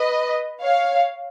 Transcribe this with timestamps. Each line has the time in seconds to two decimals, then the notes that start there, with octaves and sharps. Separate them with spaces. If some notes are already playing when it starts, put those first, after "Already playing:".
Already playing: B4 D#5
0.62 C#5 F5